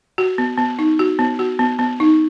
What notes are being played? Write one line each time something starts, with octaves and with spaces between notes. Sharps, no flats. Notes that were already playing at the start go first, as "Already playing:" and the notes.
F#4
B3
B3
D#4
F#4
B3
F#4
B3
B3
D#4